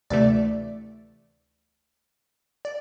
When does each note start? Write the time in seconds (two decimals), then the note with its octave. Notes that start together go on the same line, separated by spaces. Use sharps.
0.10 D2 C3 E3 A3 D5
2.65 D5